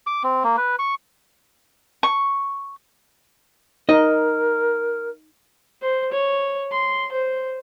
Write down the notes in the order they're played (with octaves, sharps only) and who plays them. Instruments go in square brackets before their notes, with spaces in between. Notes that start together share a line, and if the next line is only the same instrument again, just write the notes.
[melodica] D6
C4
A#3
B4
C#6
[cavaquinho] C#6
[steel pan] D#4 [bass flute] A#4 [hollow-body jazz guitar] D#5
[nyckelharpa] C5
C#5
C6
C5